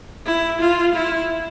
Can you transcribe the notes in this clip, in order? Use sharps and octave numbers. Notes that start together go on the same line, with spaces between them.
E4
F4
E4